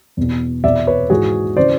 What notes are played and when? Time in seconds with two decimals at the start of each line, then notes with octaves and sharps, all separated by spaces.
0.17 E2 B2
0.64 E2 B2 D5 E5
0.87 B4 C#5
1.10 G#2 E3 F#4 G#4
1.57 C#3 E3 C5 D5